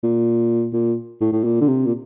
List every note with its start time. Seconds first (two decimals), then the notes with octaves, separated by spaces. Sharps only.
0.03 A#2
0.73 A#2
1.21 A2
1.33 A2
1.44 A#2
1.61 D3
1.68 C3
1.85 A#2